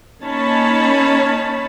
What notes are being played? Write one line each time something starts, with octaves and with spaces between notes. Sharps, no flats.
A#3 C#4 D#4 C#5 A5 B5